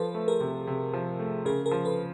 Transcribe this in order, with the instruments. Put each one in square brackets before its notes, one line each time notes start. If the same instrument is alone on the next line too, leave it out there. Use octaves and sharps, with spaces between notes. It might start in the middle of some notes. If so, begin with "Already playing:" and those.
Already playing: [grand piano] F3 [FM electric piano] A4 B4
[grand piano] A3
[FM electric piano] G#4 A#4
[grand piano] C3
C3
F3
A3
[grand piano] C#3 [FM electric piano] G#4 A#4
[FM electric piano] G#4 A#4
[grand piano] F3
[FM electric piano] A4 B4